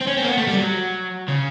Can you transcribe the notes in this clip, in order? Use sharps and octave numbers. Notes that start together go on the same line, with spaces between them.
C4
C#4
C4
A#3
B3
A3
G3
F#3
C#3